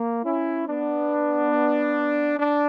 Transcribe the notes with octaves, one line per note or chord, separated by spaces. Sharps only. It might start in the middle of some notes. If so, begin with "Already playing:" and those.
Already playing: A#3
C#4 E4
B3 D4
D4